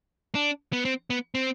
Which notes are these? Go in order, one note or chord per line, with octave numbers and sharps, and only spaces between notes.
D4
B3
C4
B3
C4